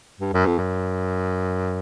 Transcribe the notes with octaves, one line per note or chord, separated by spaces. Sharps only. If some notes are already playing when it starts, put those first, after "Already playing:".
G2
F#2
F2
F#2